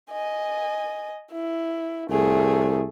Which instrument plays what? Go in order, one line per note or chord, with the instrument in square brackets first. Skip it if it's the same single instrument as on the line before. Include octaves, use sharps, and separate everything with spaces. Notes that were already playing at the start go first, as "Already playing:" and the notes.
[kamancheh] D#5 G#5
E4
[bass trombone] C2 [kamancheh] A3 G#4